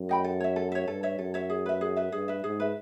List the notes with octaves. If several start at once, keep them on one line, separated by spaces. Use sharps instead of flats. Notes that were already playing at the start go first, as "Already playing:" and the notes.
Already playing: F#2
D#5 G5 B5
A4
C#5 E5
A4
C#5 E5
G2 A4
C#5 E5
F#2 A4
C#5 E5
G#4
B4 E5
G#4
B4 E5
G2 G#4
B4 E5
G#2 G#4
B4 E5